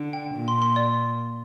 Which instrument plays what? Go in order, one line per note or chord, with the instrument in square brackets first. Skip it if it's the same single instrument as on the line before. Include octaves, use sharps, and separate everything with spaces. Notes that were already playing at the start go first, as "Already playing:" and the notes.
Already playing: [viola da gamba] D3
[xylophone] G5
[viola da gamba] A#2
[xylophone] C6
C6
D5